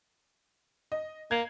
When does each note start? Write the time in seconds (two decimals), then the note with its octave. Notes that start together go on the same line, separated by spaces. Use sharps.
0.92 D#5
1.31 A#3 G#6